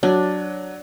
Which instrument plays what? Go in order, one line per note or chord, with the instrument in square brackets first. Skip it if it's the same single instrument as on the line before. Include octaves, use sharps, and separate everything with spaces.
[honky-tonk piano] F#3 [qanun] D4